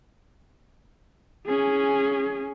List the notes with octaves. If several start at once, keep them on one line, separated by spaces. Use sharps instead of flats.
C#4 G#4